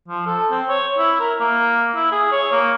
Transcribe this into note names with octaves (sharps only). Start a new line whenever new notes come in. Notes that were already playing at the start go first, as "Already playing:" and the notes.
F3
A4
C4
C#5
E4
A#4
A#3
E4
G#4
C#5
A#3